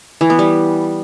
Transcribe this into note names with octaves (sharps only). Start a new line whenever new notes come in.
E3
B3
G3